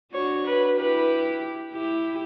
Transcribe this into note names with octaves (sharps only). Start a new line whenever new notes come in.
D4 F#4 C#5
B4
E4 G4 B4
E4 G4